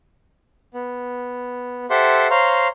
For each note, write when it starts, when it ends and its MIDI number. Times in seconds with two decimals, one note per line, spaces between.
0.74 1.86 59
1.90 2.28 67
1.90 2.28 69
1.90 2.28 72
1.90 2.28 76
1.90 2.28 78
1.90 2.28 84
2.30 2.68 72
2.30 2.68 73
2.30 2.68 77
2.30 2.68 82
2.30 2.68 84